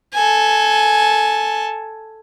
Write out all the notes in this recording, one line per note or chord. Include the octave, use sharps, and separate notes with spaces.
A4 G#5